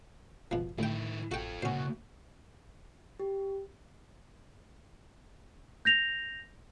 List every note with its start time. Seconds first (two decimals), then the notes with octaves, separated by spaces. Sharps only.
0.51 F#1 B2 F3
0.79 D2 A2 D#3 E4 G5
1.31 A1 F4 F#4 A4 G5
1.62 A#2 C#3 A#3 C#4 F#4 C5
3.20 G4
5.85 G6 A#6 F7